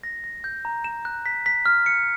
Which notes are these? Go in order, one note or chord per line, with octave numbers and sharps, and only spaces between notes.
A#6
A#6
G6
A#5
E7
F#6
B6
B6
F6
C#7